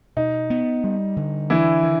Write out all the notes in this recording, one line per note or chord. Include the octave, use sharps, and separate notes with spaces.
B2 D#4
B3
G3
D3
E3 D4 E4
D#3